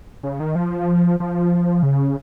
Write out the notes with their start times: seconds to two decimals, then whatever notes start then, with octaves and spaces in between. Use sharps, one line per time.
0.23 C#3
0.40 D#3
0.55 F3
1.20 F3
1.83 C#3